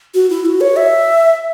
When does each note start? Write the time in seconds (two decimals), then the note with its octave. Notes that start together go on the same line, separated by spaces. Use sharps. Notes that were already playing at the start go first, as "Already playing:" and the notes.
0.14 F#4
0.30 E4
0.45 F#4
0.61 C#5
0.76 E5